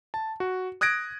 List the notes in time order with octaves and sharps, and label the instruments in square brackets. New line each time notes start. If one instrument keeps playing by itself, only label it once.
[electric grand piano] A5
F#4
D#6 F#6 G#6 A#6 D7